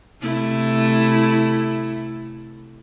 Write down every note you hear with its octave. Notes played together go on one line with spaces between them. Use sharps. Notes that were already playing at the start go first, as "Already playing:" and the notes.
C3 A3 E4